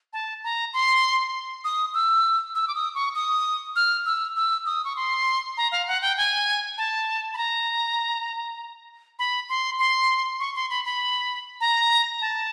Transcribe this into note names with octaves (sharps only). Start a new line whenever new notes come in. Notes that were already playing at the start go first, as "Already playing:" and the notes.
A5
A#5
C6
D#6
E6
E6
D6
D#6
C#6
D#6
F6
E6
E6
D#6
C#6
C6
A#5
F5
F#5
G5
G#5
A5
B5
A#5
B5
C6
C6
C#6
C6
B5
B5
A#5
A5